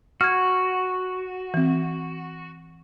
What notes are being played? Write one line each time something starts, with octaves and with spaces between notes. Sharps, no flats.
F#4 F6 G#6
E3 C4